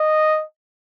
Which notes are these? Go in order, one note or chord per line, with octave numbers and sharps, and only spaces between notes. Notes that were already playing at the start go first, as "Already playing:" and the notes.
Already playing: D#5